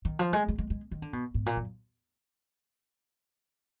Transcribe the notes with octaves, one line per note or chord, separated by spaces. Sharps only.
D#3
F3
G#3
G#3
G#3
G#3
D#3
D3
B2
G#2
A#2
F#2